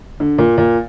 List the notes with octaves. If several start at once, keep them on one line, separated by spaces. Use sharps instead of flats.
D3
A#2
A#2